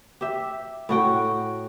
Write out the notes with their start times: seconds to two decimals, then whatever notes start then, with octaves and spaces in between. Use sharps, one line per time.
0.21 G4 E5
0.89 A2 F#4 G5